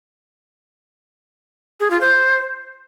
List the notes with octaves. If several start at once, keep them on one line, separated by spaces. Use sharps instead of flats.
G#4
F4
C5